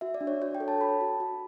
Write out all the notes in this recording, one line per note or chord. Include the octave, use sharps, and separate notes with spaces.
F#4 E5
D5
D4
C#5
F#4 C#5
G5
A4
A5
F#4 B5
F#4
F#4